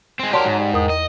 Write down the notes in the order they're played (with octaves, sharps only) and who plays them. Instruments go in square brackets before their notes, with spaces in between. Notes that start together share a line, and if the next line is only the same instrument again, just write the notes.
[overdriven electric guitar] G#3 C4
[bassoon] F#3 [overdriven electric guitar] G4 A#4 [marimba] D5 A5 C6
[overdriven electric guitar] G#2
[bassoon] G3
[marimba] E2 D#6 [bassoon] D#3
[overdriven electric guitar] D#5